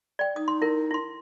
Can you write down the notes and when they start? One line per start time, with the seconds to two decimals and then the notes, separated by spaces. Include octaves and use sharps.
0.19 D5 G5
0.36 D#4 D#6
0.48 C6
0.62 E4 A#4
0.91 E4 C6